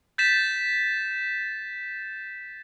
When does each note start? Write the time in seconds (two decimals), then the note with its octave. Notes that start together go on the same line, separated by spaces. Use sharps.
0.18 G6 A6 B6 E7